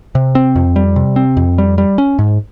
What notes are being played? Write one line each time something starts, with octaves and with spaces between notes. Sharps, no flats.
C3
C4
F2
G3
C3
C4
F2
G3
G3
C#4
G#2